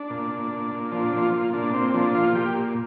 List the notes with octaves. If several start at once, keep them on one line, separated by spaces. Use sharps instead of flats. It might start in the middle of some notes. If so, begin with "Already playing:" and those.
Already playing: D4
A#2
A#2
A#2
A#2
F3 D4
A#2 D4
F4
A#2
A#2 D4
A#2 C4
F3 D4
A#2 F4
A#2 G4